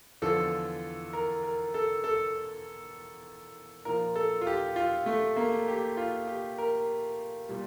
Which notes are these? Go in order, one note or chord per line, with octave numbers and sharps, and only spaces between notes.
E2 D3 F3 A4
A#4
A#4
A4
A4
A#2 F3 A#4
A4
F4
G4
F4
A3
A#3
G4
F4
G4
A#4
A#2 G3